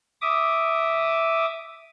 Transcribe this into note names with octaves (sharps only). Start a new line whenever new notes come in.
E5 D6 D#6